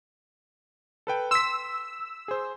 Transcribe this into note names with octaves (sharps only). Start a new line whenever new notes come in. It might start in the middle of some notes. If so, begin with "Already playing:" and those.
A4 B4 G5
C6 E6 B6
G#4 C5